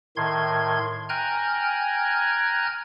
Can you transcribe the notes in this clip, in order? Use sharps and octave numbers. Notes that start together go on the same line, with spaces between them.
A2 D#3 C6 G#6
G5 G#5 A#5 F6 F#6 G#6